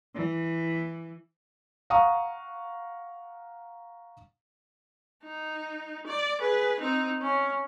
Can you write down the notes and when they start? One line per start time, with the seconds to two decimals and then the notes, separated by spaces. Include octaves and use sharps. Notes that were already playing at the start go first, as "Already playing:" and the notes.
0.15 E3
1.90 F5 F#5 A#5 C#6 D#6
5.24 D#4
6.07 D5
6.40 G#4 B4
6.80 C4 D#4
7.22 C#4